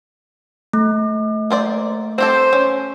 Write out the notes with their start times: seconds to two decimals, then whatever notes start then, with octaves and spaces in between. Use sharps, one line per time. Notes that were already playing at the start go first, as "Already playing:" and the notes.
0.73 A3
1.50 A#3 C5 D5
2.18 C4 G4 A4 C5
2.53 C#4